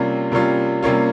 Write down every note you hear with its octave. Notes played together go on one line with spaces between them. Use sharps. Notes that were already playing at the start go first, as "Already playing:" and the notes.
Already playing: C3 G3 A#3 C#4 F4
C3 G3 A#3 C#4 F4
C3 G3 A#3 C#4 F4